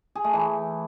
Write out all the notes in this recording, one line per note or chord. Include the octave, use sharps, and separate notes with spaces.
G#4
A3
E3